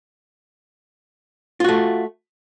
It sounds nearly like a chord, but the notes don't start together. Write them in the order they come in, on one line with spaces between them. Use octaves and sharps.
F4 F#4 A3